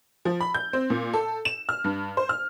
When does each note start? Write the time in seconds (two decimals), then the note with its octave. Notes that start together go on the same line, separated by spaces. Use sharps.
0.25 F3
0.40 B5
0.54 G6
0.73 C4
0.90 A#2
1.13 A4
1.45 E7
1.69 F6
1.84 G2
2.17 C5
2.29 F6